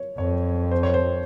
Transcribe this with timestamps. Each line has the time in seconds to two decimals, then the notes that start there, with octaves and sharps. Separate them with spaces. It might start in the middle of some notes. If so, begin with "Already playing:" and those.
Already playing: C#5
0.18 F2 C#5
0.71 C5
0.83 C#5
0.94 C5